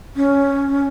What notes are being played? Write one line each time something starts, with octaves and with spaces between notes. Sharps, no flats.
C#4